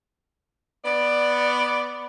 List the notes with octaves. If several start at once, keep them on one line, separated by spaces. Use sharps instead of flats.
B3 D5